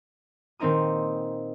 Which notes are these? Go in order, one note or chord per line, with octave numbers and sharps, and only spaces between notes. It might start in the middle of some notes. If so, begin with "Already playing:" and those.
A#2 D#3 C4 D#4 A#4 D#6